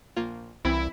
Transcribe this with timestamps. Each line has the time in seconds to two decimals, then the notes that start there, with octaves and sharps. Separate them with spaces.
0.16 A#1 A#3 F4
0.65 C2 E3 C4 E4